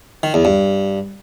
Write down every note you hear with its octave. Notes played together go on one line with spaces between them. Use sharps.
D#3
E2
G2